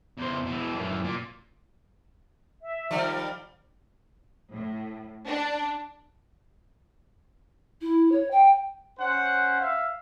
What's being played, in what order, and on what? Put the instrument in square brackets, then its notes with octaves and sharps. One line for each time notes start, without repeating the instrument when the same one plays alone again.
[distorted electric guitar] E2 C5
B2 E3
F#2 E3
A#2
[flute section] E5
[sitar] D#3 F3 G3
[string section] A2
D4
[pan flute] E4
C#5
G5
[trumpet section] C#4 C5 F#5
E5 F5